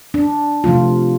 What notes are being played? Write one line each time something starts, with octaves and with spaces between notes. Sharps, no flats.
D4
C3 F3 A3 F4